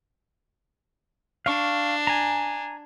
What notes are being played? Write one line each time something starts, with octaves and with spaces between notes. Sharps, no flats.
D4 F5 C#6
G#5 A#5